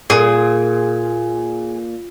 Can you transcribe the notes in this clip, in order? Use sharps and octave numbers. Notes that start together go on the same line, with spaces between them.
A#2 G#4